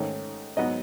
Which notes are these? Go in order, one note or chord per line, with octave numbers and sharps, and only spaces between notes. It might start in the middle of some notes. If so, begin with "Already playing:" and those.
Already playing: G#2 D#3 A3 C#4
G#2 F#3 B3 D#5